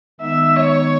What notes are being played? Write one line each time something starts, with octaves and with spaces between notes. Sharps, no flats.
D#3 G#3 B3 D#4 E5
C#5